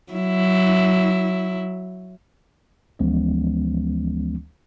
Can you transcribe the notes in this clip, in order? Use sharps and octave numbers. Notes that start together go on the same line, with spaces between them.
F#3 E4
D2 E3 F3 G#3 B3 C#4